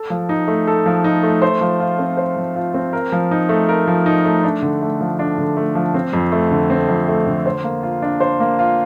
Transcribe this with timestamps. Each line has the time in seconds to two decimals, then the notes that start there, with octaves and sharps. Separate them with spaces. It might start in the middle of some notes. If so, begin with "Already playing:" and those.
Already playing: A4
0.10 F3
0.29 D#4
0.48 A3
0.67 A4
0.86 F3
1.04 D#4
1.23 A3
1.42 C5
1.61 F3
1.80 F4
1.99 C4
2.17 C5
2.36 F3
2.56 F4
2.74 C4
2.93 A#4
3.12 F3
3.31 D#4
3.49 A3
3.69 A#4
3.87 F3
4.06 D#4
4.25 A3
4.43 D4
4.62 D3
4.82 A3
5.01 F3
5.19 D4
5.38 D3
5.57 A3
5.75 F3
5.94 C4
6.13 F2
6.32 A3
6.51 D3
6.70 C4
6.88 F2
7.08 A3
7.27 D3
7.46 C5
7.64 A#3
7.83 F4
8.02 D4
8.20 C5
8.40 A#3
8.59 F4